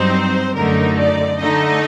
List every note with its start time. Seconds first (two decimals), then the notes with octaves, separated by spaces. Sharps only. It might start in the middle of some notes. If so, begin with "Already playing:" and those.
Already playing: G2 F#3 C4 D#4 C5
0.56 F#2 D3 A3 D#4 A#4
0.99 D5
1.41 D3 A3 D#4 D#5